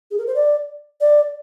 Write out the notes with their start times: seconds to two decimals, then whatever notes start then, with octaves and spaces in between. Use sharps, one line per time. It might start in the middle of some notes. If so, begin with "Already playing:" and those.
0.11 G#4
0.18 A#4
0.27 C5
0.35 D5
1.01 D5